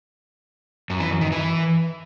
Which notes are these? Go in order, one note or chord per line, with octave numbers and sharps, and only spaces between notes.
F#2
E3
F#2
D#3
E3